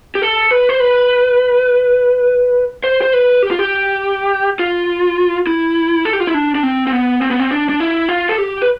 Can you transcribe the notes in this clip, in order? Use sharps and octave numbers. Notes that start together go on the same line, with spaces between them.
G4
A4
B4
C5
B4
C5
C5
B4
G4
F4
G4
F4
E4
A4
G4
F4
E4
D4
D4
C4
C4
B3
C4
B3
C4
D4
D4
E4
F4
A4
G4
B4